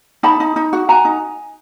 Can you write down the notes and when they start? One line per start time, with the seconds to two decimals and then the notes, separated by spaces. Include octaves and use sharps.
0.23 D#4 A5 B5
0.40 D#4
0.56 D#4
0.73 F#4
0.89 F#4 G#5 A#5
1.05 D#4